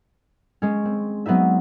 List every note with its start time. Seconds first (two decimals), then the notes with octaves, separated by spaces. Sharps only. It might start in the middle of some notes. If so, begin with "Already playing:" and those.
0.62 G#3 C#4
0.85 C4
1.26 F#3 B3 C4 D#4 E5